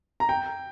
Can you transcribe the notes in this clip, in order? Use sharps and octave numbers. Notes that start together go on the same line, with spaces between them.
A#5
G5